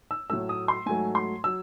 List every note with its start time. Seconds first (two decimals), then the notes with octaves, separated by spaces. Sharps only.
0.11 E6
0.30 A2 F#3 A3 E6
0.49 D#6
0.68 C6
0.86 G#2 F#3 A3 G#5
1.15 C6
1.44 F#3 E6